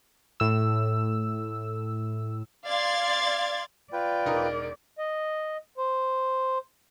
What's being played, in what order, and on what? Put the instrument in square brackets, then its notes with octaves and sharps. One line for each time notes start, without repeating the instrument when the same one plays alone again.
[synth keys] A2 E6
[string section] D5 F5 C6 G#6 A6
[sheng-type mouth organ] F4 B4 G5 [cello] D5
[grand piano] E1 D#4 A#4
[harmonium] D#5
C5